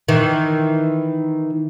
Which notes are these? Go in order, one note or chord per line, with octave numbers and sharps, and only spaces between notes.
D#3 E3